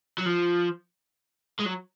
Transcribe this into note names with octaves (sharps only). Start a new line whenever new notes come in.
F#3
F3
G#3
F#3